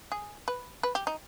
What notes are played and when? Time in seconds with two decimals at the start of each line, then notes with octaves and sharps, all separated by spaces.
0.12 G#4
0.48 B4
0.83 B4
0.95 G4
1.07 D#4